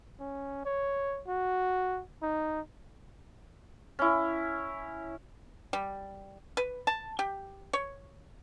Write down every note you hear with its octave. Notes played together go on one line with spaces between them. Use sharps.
C#4
C#5
F#4
D#4
C#4 E4
G3
B4
A5
G4
C#5